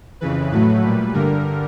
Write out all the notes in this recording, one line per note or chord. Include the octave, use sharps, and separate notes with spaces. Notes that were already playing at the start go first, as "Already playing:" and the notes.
F2 C#3 E3 B4
A2 F#3 A3 B4
A#2 G3
G2 D3 G3 A#4